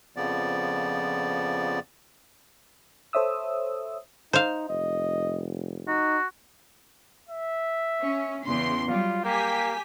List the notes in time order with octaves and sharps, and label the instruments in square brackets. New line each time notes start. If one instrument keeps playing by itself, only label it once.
[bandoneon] F2 C#3 F3 B3 D5
[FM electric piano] A4 C5 C#5 E5 D#6 E6
[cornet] D#4 [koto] C5 F5
[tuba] F1 [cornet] D#5
[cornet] D#4 [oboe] F#4
[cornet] E5
[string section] C#4
E2 C#3 C6
[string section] F#3 G3 [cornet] F4
[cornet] A#3 [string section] G4 G#5 B6